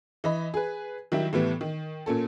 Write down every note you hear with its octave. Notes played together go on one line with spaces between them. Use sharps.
E3 D#5 B5
G#4 B4
D#3 F#3 G3 E4 G4
A2 E3 G3 B3
D#3
A#2 A#3 C#4 A4